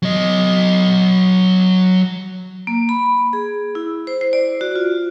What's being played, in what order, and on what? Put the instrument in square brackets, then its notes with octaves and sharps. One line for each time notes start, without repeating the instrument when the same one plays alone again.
[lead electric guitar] F#3 D#5
[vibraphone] A#3
B5
G#4
E4
C5
C5
D5
F#4
F4